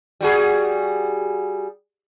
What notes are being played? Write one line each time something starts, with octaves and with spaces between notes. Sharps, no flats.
G3 F#4 G#4